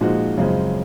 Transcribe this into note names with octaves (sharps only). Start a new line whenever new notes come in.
A#2 F3 G#3 D#4 F#4
F#2 C#3 F3 G#3 C4